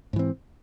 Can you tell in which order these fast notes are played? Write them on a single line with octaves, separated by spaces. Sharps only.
G#2 E3 C4